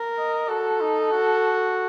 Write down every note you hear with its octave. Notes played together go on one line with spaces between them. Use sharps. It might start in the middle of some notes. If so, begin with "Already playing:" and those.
Already playing: A#4
D#5
F#4 A4
D#4
F#4